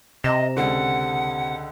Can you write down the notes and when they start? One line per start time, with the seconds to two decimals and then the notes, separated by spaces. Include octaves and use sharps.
0.24 C3 D#5 A#5 E7
0.57 C#2 D3 F#5